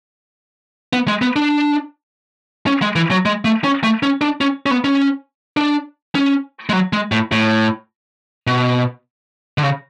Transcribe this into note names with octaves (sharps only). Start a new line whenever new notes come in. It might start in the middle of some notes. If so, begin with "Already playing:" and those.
B3
G#3
B3
D4
C#4
G#3
E3
F#3
G#3
A3
C#4
A3
C#4
D4
C#4
C#4
B3
C#4
D4
C#4
G#3
F#3
G#3
A2
A2
B2
D3
C#3